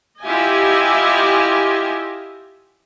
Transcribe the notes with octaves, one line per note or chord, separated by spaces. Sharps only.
E4 F4 G4 D#5 G#5